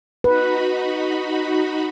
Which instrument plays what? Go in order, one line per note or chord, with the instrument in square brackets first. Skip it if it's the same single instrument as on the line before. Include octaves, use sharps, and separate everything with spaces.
[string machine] D#4 F#4 B5 [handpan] B4